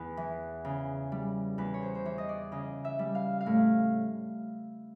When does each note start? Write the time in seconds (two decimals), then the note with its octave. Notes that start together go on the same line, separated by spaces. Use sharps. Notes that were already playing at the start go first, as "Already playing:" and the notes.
Already playing: E2 B4
0.17 E3
0.65 C#3
1.12 G3
1.58 E2 B4
1.74 C#5
1.82 C5
1.95 C5
2.05 E3 C#5
2.18 D#5
2.29 D5
2.52 C#3 D#5
2.85 E5
2.99 G3
3.15 F5
3.41 F5
3.46 A2